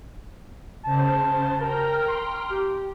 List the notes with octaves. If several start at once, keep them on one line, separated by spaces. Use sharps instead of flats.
C#3 C5 A5
A#4 G5 A#5 F6
C6
G4